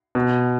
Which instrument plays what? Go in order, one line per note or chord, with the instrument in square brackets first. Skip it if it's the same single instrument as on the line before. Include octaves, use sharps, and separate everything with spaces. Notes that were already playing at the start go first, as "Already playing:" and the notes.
[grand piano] B2